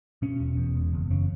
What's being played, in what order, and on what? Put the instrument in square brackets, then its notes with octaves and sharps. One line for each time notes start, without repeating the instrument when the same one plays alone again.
[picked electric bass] B2 C#4
E1
E2
E1
F#1
C#3